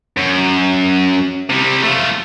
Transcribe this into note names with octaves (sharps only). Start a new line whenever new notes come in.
F#2
C3 G3
A3 F4